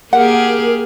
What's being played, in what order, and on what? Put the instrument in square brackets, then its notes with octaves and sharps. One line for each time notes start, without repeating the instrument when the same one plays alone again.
[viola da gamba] A#3 G4 G#4 [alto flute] A#4 [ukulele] F#5